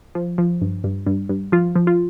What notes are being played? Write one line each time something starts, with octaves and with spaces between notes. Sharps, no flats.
F3
F3
G2
G2
G2
G2
F3 F4
F3
F4